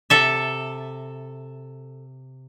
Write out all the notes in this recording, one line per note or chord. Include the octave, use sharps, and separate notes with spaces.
C3 A4 E5